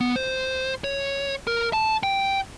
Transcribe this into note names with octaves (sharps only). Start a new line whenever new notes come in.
B3
C5
C#5
A#4
A5
G5